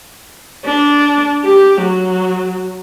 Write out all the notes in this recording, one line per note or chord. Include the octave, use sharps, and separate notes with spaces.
D4
G4
F#3